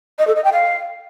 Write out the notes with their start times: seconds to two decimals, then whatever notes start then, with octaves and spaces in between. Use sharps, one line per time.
0.19 D#5
0.27 A4
0.36 D#5
0.44 G5
0.53 F5